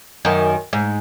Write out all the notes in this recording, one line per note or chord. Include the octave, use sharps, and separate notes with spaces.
F#2 D#3
G#2